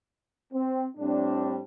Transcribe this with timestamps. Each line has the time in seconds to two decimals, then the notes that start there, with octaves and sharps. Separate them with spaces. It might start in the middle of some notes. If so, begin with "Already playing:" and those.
0.53 C4
0.97 A2 G3 C4 D4